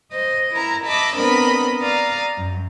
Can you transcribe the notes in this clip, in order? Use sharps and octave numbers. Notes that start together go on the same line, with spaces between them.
C5 D#5
E4 A#4 A#5
D#5 E5 A5 B5 D6
B3 C4 D4 A#4 D#5 B5
D5 F5 A#5 D#6
F#2